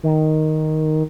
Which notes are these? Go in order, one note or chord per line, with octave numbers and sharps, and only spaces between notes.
D#3